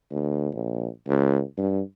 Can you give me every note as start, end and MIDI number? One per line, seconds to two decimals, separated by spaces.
0.11 0.49 38
0.54 0.88 34
1.08 1.41 37
1.57 1.81 43